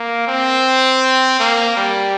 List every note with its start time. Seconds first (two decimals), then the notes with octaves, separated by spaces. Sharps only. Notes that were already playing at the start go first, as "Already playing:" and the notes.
Already playing: A#3
0.27 C4
1.40 A#3
1.77 G3